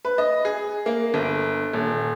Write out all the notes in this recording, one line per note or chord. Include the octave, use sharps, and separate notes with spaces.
B4
D#5
G#4
A#3
G1
D#1